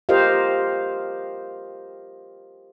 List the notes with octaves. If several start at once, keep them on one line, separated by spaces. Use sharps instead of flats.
F4 G4 A#4 C5 D#5 F5